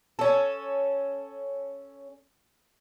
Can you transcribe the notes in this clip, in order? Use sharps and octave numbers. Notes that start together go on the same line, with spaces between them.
C#4 A4